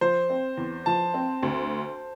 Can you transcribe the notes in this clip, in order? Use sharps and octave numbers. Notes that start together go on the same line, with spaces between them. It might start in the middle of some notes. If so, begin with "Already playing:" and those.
F3 C5
C4
E2
F3 A5
C4
D2